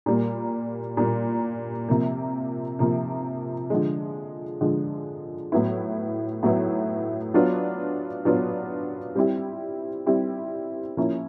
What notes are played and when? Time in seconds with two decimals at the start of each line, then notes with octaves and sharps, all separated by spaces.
0.06 A#2 G3 A#3
0.97 A#2 G3 A#3
1.89 C3 F3 A#3
2.79 C3 F3 A#3
3.70 D3 F3 G#3
4.61 D3 F3 G#3
5.52 A2 F#3 B3 E4
6.43 A2 F#3 B3 E4
7.34 F#3 B3 D4 F4
8.25 F#3 B3 D4 F4
9.15 G3 C4 E4 G4
10.06 G3 C4 E4 G4
10.97 F3 A#3 C#4 E4